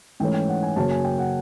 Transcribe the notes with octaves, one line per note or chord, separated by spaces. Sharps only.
G#2 E3 A3 C#4 G5
G5
F#5
G#5
F#2 C#3 F#3 A#3 C#4 A5
G#5
G5
F#5